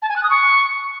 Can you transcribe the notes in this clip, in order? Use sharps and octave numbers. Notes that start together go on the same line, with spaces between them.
A5
G#5
F#6
D#6
C#6